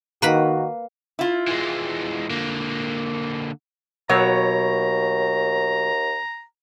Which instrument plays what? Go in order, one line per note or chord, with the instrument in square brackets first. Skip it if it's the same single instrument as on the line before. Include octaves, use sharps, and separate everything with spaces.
[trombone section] D#3 F#4 [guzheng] A#3 B4 B5
[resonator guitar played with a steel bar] E4 F4
[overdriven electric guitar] E3 G#3
D3 A#3
[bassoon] D#2 [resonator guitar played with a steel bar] B2 F#3 C#5 [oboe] A#5